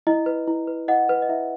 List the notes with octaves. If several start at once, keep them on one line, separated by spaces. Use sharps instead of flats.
E4 D#5
B4
E4
B4
E4 D#5 F#5
B4
D#5
E4 E5